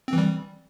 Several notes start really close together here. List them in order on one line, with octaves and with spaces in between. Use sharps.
C4 E3 G3